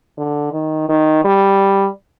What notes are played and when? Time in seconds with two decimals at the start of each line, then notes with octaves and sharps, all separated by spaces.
0.18 D3
0.52 D#3
0.89 D#3
1.24 G3